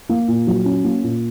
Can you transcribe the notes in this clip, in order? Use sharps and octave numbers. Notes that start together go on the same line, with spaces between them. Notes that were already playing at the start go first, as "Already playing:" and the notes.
A#3
A#2
F#3
C#4
A#3
A#2